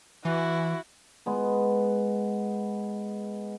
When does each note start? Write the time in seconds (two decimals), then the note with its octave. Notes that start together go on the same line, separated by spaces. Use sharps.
0.25 E3 E4 F#4
1.26 G#3 B3